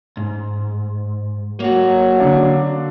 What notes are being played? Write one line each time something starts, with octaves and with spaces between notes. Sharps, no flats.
G#2
F#3 A#3 F#4
D3 D4 F5